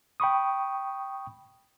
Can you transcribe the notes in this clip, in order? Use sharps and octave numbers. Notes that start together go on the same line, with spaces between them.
G5 B5 C#6 D#6